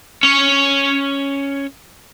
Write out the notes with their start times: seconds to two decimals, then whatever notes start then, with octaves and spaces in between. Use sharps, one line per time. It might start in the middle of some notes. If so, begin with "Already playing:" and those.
0.23 C#4 C#5